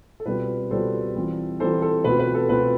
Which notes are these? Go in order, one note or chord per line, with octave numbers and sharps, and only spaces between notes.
A4
B2 G3 C4 F4 B4
B2 G3 C4 F4 A4 C5
E3 G3 C4 F4
E3 G3 C4 F4 A4 C5
A4
B2 A3 C4 F4 B4
B4
A4
B2 A3 C4 F4 B4